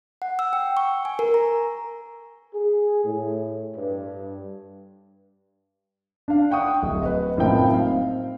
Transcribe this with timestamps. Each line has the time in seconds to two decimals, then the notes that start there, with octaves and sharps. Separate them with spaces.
0.22 F#5
0.39 E6
0.53 G5
0.77 C#6
1.05 G#5
1.19 A#4
1.34 A#5
2.54 G#4
3.04 A2
3.76 G2
6.28 D4 F5
6.51 F#5 G5 C#6 D#6
6.82 D1
7.02 B4 D#5
7.37 F#1 A2 F3 C4 D#4 G5
7.73 C4 F5